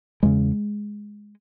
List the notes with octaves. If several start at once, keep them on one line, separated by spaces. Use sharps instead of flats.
E2 C#3 G#3